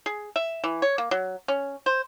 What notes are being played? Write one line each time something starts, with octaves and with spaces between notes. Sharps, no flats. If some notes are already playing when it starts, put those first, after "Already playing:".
G#4
E5
E3
C#5
A#3
F#3
C#4
C5